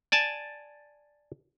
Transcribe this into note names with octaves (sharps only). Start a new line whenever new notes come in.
D5 G#5 A5